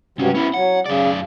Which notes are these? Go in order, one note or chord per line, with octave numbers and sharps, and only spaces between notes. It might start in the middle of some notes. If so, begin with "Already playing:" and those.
C#2 G2 C3 F#3 C#4
B3 C#4 E4
F#3 F#5
F#2 C#3 D5